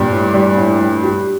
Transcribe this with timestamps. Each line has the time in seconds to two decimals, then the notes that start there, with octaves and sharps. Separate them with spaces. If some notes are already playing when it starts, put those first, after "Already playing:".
Already playing: G2 A#2 G3
0.12 A2
0.34 G3
0.57 A2
0.80 G3
1.03 G4